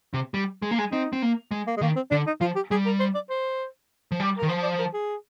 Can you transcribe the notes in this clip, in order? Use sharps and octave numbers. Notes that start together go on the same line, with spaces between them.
C3
G3
G#3
A#3
G#3
C4 D#4
C4
A#3
G#3
A#3
G#3
D#3 A#3
C4
D3 D4
D#4
F3 F4
G4
G3 G#4
A#4
C5
D5
C5
F3
G3
D#3 A#4
F3 C5
D5
A#4
G#4